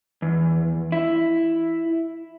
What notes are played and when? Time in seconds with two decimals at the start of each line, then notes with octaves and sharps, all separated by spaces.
0.22 E2
0.92 E4